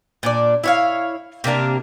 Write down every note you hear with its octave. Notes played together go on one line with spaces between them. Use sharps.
A#2 D4 D5
E4 C#5 F5
C3 A#3 D4 A#4